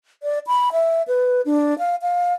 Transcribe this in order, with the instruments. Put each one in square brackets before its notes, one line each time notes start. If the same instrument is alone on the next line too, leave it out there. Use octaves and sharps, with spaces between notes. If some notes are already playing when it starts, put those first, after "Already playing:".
[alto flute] D5
B5
E5
B4
D4
F5
F5